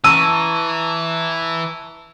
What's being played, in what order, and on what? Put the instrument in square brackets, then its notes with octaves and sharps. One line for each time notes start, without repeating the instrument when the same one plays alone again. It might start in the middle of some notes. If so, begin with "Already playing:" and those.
[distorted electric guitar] E3 [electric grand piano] A5 A#5 C#6 [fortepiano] E6 [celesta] D#7